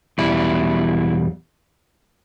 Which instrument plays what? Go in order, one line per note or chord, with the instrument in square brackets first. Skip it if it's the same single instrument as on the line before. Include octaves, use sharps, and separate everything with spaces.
[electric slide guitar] E2 B2 G3 E4